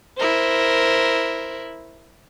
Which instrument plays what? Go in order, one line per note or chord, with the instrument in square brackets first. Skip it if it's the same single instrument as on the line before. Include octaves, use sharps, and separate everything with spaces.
[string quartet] E4 A#4 C5